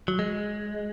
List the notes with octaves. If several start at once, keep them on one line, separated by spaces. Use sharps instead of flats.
F#3
G#3